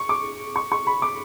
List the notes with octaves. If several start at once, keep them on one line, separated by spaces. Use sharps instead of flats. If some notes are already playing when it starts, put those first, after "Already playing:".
Already playing: C#6
D6
C#6
C#6
B5
D6